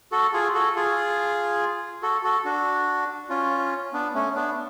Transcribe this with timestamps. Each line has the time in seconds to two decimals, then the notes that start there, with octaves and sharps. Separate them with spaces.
0.12 F#4 A4
0.33 F4 G#4
0.54 F#4 A4
0.75 F4 G#4
2.02 F#4 A4
2.24 F#4 A4
2.45 D4 F#4
3.30 C#4 F4
3.93 B3 D4
4.14 A3 C#4
4.35 B3 D4